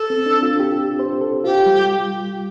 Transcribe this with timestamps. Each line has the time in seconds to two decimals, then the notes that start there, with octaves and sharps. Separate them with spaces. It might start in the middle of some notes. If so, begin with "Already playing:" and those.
Already playing: A4
0.10 C4
0.26 D4
0.43 F4
0.60 G4
0.99 C5
1.21 A4
1.44 F4 G4
1.66 G3